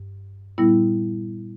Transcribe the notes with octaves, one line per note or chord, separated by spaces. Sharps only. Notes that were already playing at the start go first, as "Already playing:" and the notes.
Already playing: G2
A#2 G3 B3 E4